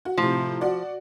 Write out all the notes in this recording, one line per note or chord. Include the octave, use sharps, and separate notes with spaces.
F#4
A2 C3 F3
F#4 D5